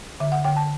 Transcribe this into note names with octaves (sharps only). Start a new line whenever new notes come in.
D3 E5
F#5
D3 G5
A5